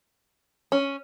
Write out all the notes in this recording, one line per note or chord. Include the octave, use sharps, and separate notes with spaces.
C#4